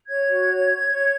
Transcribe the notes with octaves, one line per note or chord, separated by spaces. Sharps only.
C#5 G#6
F#4
C#5
C#5
C#5